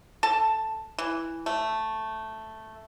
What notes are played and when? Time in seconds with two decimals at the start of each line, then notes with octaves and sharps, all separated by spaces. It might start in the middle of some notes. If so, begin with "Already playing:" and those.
0.23 A4 A5
0.98 E3
1.46 A3